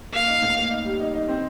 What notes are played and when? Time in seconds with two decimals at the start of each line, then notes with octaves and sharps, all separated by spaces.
0.13 A#3 F5
0.27 D#4
0.42 A2
0.57 A#3
0.70 D#4
0.85 G3
1.00 D#4
1.14 D#4
1.28 C4